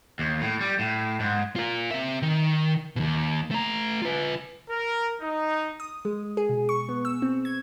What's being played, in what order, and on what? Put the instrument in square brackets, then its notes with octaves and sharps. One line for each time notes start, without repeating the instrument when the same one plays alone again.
[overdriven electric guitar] D#2
A2
G3
A2
G#2
[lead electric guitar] F4 A#4
C4 E5
D#3
D#2 B2
A3 A#5
F4 B4
[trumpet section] A#4
D#4
[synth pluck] D#6
G#3
G#4
B2
C#6
B3
E6
C4
G#6